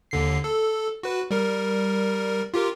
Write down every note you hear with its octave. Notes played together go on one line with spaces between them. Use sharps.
D#2 D3 C7
A4
F#4 B4
G3 A#4
F4 G4 A#4